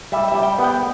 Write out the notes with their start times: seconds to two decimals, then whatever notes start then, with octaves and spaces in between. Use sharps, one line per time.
0.12 G3 E5
0.28 E5
0.35 G3
0.43 G5
0.59 B3
0.64 G5